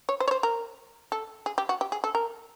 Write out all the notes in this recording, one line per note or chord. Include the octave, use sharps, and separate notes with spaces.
C#5
C5
C#5
C5
A#4
A4
G#4
G4
F#4
G4
G#4
A4
A#4